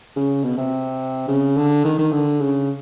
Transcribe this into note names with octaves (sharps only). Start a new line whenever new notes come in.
C#3
B2
C3
C#3
D3
D#3
D#3
D3
C#3